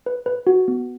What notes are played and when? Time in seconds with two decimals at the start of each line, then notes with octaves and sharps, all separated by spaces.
0.06 B4
0.26 B4
0.47 F#4
0.68 B3